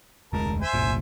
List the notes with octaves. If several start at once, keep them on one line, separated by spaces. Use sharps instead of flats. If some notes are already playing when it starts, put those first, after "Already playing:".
F1 D2 G#3 A#4 A5
C5 E5 G#5
F#1 C2 A#2